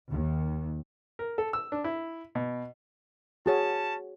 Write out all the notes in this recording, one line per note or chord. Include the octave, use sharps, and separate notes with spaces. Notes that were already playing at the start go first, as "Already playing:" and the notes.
D#2
A#4
A4
E6
D4
E4
B2
C#4 F#4 G#4 C#5 A5